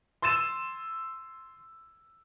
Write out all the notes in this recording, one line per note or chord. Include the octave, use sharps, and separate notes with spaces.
C6 E6 A6 D#7 E7